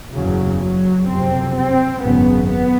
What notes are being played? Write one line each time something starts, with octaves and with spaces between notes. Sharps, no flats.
F#1 E2 C#3 F#3
F#3
F#1 F2 C3 C4
C4
G#1 F#2 C#3 B3
B3